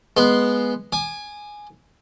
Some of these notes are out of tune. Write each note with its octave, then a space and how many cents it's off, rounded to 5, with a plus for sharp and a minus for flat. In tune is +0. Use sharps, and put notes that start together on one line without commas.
G#3 +0 B3 -5 C6 +0
G#5 +0 D6 +45